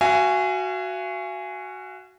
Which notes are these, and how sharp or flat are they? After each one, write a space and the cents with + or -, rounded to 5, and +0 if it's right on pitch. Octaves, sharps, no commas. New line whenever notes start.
F#4 +0 F5 -45 G#5 +0